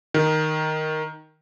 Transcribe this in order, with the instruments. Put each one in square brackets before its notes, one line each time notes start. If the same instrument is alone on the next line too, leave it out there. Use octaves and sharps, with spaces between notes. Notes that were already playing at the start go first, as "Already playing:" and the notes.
[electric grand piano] D#3